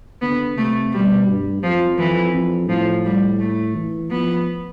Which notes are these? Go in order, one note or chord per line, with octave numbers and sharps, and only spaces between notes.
D3 B3
C3 A3
B2 G3
G2
F2 F3
F2 E3
F2
A2 F3
G3
A3
E3
F3 B3